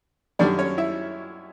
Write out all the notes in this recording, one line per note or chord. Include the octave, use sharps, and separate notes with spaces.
F#2 D#3 G3 D4 D5
C#4 C#5
E4 E5